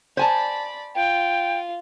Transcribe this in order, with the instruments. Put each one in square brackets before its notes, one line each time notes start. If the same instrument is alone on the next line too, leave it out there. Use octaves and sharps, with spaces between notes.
[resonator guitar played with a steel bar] C5 G#5 A5 [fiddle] D5 B5
[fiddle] F4 [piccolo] G5